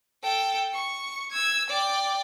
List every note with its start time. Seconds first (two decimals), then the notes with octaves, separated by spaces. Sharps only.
0.23 A4 G5
0.73 C#6
1.31 E6 G#6
1.69 D5 G5